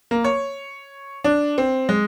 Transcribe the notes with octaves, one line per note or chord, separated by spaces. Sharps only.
A#3
C#5
D4
C4
G#3